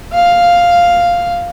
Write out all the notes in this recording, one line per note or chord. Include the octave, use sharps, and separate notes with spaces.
F5